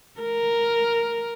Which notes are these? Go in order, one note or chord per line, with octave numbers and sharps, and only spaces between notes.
A#4